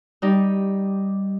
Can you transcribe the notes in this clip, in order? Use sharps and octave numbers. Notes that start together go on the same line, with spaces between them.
G3 D#4 G4